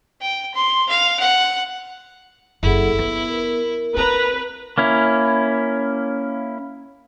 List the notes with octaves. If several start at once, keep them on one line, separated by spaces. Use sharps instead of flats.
G5
C6
F5
F#5
F#1 E4 G#4 A4 F#5
B3 B4
A#4
C4 B4 A#5
A#3 C#4 E4